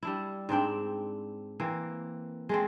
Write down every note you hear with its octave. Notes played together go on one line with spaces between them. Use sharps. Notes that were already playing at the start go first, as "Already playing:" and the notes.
G3 D4 E4
G#2 C4 D4 G5
E3 A#3 C4
G#3 A3 C4